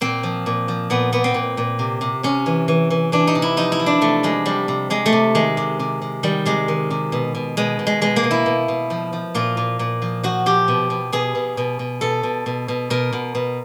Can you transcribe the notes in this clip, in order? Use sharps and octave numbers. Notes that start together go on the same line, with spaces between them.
A#2 C4
F3
A#2
F3
A#2 B3
A#2 B3
C4
A#2
A#2
C3
C3
C3 C#4
E3
E3
E3
E3 D4
D#4
C3
E4
F3 D#4
E4
F3
D4
C3 A3
F3 G#3
C3 G3
C3
C3 G#3
A3
C3
D#3 G#3
C3
C3
C3
D#3 G3
C3 G#3
D#3
C3
B2
B2
B2 G#3
B2
G#3
B2 G#3
A#3
B2
E4
B2
B2
F3
F3
A#2 F4
A#2
A#2
F3
F3 F#4
F3 G4
B2
B2
B2 G#4
B2
B2
B2
B2 A4
B2
B2
B2
B2 A#4
B2
B2